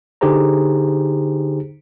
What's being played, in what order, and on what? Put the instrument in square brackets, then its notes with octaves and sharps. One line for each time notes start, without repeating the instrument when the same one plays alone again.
[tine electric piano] D3 D#4 G4 G#4 C5 A#5